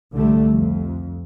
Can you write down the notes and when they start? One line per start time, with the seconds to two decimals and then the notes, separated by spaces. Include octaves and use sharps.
0.13 C2 D3 G3 A3
0.52 F2